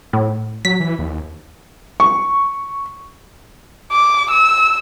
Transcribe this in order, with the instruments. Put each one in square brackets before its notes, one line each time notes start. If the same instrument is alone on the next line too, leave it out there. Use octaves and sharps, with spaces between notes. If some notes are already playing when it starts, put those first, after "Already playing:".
[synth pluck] A2
[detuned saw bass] F#3 [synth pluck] B6
[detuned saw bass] E3
D#2
[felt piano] C#6
[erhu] D6
E6